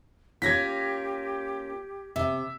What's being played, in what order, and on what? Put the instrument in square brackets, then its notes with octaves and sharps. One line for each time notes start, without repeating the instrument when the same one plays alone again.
[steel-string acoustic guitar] A#3 C#4 F4 [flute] G4 [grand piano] G#6 A#6 B6
[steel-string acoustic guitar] C3 [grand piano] E5